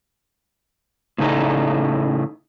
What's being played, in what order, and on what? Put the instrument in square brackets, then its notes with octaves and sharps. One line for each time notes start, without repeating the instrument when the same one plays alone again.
[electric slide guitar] A2 C#3 A3 D#4